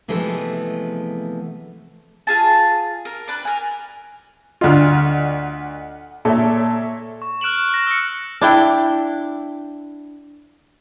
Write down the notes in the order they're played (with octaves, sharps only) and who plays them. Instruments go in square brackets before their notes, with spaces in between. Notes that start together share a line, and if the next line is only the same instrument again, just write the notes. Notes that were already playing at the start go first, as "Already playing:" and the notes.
[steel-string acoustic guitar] C3 E3 F3 G#3 A3 B3
[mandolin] F4 G#4 A5
A#4
D4 B4
A#4 G#5
[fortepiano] D2 F4 [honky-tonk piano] D#5 F#5 F6
[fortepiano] A#2 [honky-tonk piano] A4 C#5 E5
[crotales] C#6
F6 F#6 D7 E7 F#7
F6
F#6 A#6
E6 F#6 C#7
[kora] D4 E4 G5